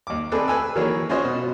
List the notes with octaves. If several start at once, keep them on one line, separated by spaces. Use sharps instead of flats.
D#2 D6
A3 C4 G#4 A4 B4 D5
B4 G#5 E6
D#3 E3 F#3 A#3 G#4 C#5
C#4 F4 F#4 C5 D#5
B2